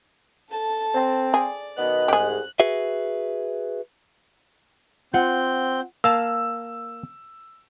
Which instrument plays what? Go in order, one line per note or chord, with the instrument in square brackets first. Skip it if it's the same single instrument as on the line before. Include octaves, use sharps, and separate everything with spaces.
[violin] A4 A5
[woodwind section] C4
[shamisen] G#4 [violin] D5
[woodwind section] B2 D#3 B3 [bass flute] D#5 [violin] F#6
[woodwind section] C2 G#2 [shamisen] G4 G#4
[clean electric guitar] F#4 G#4 B4 E5
[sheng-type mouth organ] C4 G6 [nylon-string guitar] F4 F#5
[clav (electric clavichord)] A#3 F5 A5 [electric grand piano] E6